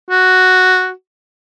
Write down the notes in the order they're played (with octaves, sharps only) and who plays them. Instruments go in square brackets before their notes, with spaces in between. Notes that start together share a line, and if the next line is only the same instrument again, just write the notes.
[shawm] F#4